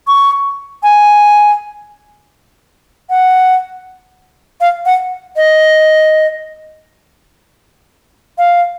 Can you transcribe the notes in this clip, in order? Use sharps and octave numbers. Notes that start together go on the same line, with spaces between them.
C#6
G#5
F#5
F5
F#5
D#5
F5